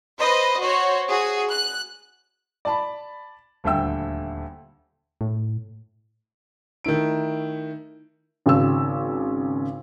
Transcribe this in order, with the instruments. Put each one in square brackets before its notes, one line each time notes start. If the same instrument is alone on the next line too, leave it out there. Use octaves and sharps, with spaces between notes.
[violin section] B4 C5 D#5
F#4 C5 C#5
F#4 G#4
F#6
[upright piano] D5 A5 B5
D#1 D2 D3 E5 G5 E6
[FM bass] A2
[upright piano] D#3 A3 E4 D7
[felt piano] G#1 C#3 E6